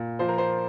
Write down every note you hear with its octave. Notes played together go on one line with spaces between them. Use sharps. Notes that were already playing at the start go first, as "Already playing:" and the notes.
Already playing: A#2
F3 C5
A#4
C5